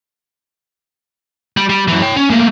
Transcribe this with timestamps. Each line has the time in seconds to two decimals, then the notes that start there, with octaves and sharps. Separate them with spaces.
1.57 G3
1.70 G3
1.88 F#2 E3
2.02 C#5 G5
2.16 C#4
2.30 A3 A#3